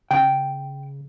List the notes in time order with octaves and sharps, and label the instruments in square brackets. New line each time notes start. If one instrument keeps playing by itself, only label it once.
[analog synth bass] C#3 [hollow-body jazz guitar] G5